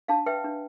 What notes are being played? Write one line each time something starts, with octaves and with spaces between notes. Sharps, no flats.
D4 F5 A5
B4 E5 G5
D4